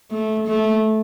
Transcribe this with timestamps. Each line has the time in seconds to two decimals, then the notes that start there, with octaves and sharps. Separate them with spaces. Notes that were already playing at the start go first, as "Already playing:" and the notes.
0.12 A3
0.47 A3